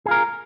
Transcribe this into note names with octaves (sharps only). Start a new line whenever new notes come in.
F4 G#4 A#4